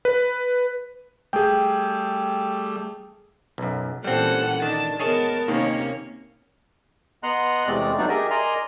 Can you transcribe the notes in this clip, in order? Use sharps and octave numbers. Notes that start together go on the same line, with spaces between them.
B4
G3 A3 G#4 G5
B1 F#2
A#2 E3 G3 C4 C#4 A4 F#5
D#3 D4 A5
B3 G#4 A#4 C#5 D#5 A5
D#2 C3 D#3 A#3 C#4 C#5
B3 D#5 F#5 A#5 C6 F#6
E2 C3 G#3 A3 C4 D5
F#3 A3 B3 D4 D#4 D5
G4 G#4 A#4 D#5 E5
A#4 D5 D#5 G#5 A#5 C6